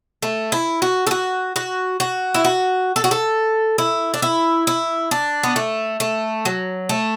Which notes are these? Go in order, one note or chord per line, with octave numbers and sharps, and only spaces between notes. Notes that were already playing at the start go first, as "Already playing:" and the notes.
A3
E4
F#4
A4
F#4
F#4
F#4
E4
F#4
A4
F#4
A4
E4
D4
E4
E4
D4
B3
A3
A3
F#3
A3